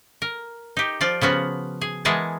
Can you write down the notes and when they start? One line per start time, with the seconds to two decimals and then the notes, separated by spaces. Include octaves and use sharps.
0.22 A#4
0.77 D#4 G4
1.01 F3 F4 D5
1.21 C#3 F3 B3 F#4
1.81 G#4
2.05 E3 G#3 B3 G#4 A#4 A5